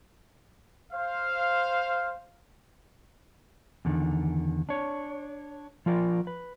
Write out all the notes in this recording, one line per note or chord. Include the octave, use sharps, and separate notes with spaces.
C5 F5
E2 D3 D#3
D4 C#5
F3 F4 A#4 D5
B4